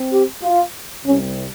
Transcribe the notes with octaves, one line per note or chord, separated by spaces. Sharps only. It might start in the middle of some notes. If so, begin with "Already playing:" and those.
Already playing: C4
G4
F4
C2 C3 G3 C#4